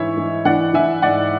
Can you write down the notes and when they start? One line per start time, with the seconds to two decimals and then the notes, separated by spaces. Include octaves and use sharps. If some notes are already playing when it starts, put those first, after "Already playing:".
Already playing: G#2 E3 C#5 E5
0.17 E3
0.45 E3 D5 F#5
0.74 E3 E5 G#5
1.02 G#2 D5 F#5